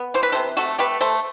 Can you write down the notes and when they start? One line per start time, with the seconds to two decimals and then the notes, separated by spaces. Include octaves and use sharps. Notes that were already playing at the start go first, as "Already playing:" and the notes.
Already playing: B3
0.14 E3 C5
0.23 B4
0.32 C3 A4 C5
0.57 A3 F#4 A4
0.78 A3 G4 B4
1.01 A3 A4 C5